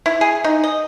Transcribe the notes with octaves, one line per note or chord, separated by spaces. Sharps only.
E4
G#4
D#4
D#5